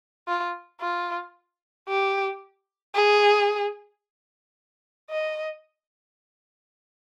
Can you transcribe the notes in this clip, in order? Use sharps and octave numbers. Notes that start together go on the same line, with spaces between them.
F4
F4
G4
G#4
D#5